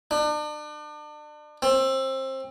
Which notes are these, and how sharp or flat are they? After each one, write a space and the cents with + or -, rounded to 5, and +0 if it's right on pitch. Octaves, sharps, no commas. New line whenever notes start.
D4 +35
C4 +25